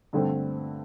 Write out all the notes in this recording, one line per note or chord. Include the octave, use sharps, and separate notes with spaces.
G2 D3 A3 C4